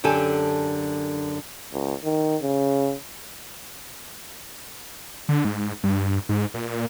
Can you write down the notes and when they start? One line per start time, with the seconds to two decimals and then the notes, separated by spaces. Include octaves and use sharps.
0.04 F#2 D3 G4 A4 G#5
1.73 C#2
2.04 D#3
2.43 C#3
5.29 D3
5.45 G#2
5.83 G2
6.29 G#2
6.54 A#2